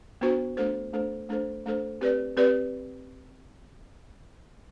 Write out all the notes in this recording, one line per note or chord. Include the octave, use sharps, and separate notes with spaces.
B3 D4 F#4 C5
A3 D4 A4 C5
A3 D4 A4 C5
A3 D4 A4 C5
A3 D4 A4 C5
C4 G4 B4 D5
C4 G4 B4 D5